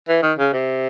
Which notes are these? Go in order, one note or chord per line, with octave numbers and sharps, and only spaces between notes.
E3
D#3
C#3
C3